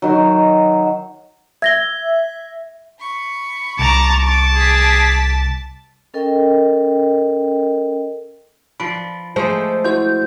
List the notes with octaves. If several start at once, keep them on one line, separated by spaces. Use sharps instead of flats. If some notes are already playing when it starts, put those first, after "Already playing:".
D#3 F#3
E5 G#6 A#6 G7
B5 C#6
C2 A5 A#5 D6
A5
G#4 D6 B6
C#4 A4 A#4 D#5 G5
F3 B4 D5 B5
F3 G#3 A3 C5
E4 F#4 C5 G6